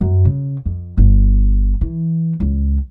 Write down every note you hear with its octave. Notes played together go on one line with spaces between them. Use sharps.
F#2
C#3
F2
G1
E3
C#2